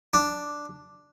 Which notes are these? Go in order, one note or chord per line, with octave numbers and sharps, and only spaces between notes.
D4